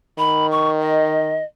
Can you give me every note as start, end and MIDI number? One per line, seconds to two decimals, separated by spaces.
0.18 1.40 51
0.18 0.47 83
0.51 0.69 85
0.81 1.44 75